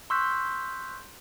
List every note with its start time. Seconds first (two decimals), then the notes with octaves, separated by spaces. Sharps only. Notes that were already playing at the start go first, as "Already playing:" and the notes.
0.10 C6 C#6 E6 F#6 G6 B6